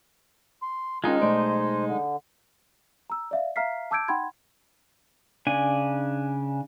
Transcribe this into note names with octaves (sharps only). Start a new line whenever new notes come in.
C6
D#3 G#3 C#4 D#4 F4
B1 A3 C5 D5
D3
A#5 E6
D5 E5 F5
E5 F5 A#5 F6 B6 C7
A5 D6 E6 G6 G#6 D7
D#4 F#5 G5 B5 C6 G#6
C#3 D4 G#5